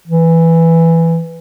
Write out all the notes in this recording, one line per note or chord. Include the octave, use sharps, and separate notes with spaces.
E3